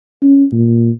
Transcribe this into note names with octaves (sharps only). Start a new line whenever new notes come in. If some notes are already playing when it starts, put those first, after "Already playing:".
C#4
A#2